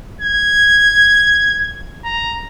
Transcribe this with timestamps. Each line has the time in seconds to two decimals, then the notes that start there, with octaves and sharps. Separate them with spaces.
0.21 G#6
2.04 A#5